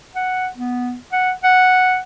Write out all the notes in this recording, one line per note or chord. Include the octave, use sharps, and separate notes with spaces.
F#5
B3
F#5
F#5